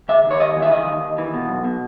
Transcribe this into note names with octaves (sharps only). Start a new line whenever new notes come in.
C#3 E5
D#2
C#5
D#2 D#5
E3
E5
C#3 D#5
D#2
D#2
E3
B2
B1
B2